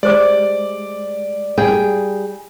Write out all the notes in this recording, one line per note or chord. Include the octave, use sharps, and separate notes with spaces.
G#3 G4 C5 D5 D6
G3 G#4 G5